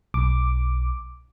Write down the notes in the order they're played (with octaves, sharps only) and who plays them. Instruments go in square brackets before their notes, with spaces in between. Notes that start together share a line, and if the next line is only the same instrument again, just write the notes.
[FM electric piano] B1 D6